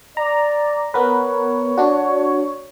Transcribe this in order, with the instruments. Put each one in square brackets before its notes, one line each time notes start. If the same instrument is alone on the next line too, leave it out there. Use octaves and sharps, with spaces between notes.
[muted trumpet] D5 [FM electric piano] A#5
[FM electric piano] B3 A#4 B4 [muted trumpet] C#5
[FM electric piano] D4 F#4